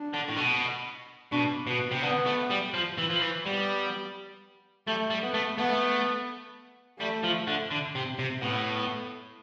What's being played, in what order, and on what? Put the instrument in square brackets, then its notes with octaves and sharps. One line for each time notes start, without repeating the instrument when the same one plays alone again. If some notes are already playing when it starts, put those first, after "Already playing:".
Already playing: [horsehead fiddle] D4
[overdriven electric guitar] D3
A2
B2
[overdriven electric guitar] B2 [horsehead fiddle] D4
[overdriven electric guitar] B2 [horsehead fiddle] B3
[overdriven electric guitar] C3
[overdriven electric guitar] D3 [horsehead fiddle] B3
[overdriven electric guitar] A3
G3
F3
E3
F3
E3
[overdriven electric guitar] G3 [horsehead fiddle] B3
[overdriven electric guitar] G3 [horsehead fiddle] A3
[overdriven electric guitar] G3
[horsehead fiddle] B3
[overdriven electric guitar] A3
[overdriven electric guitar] A3 [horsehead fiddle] B3
[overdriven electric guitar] G3 [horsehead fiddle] A3
[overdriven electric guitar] F3
D3
D3
C3
C3
[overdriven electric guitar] A2 [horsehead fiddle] B3